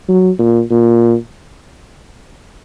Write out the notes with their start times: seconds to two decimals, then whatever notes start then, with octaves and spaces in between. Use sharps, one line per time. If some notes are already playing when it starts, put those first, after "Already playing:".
0.08 F#3
0.39 A#2
0.71 A#2